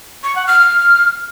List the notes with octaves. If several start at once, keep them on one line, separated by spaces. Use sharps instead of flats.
C#6
F#5
F6
F6